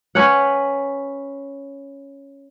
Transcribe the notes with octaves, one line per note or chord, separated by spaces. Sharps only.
C#4 B4 C#5 F#5